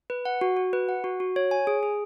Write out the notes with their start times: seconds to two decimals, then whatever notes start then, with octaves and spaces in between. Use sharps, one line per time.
0.10 B4
0.25 F#5
0.41 F#4
0.57 F#4
0.73 B4
0.89 F#5
1.04 F#4
1.20 F#4
1.36 C#5
1.51 G#5
1.67 G#4
1.83 G#4